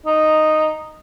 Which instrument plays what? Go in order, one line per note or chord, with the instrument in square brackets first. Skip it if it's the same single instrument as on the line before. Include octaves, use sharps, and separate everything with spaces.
[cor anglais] D#4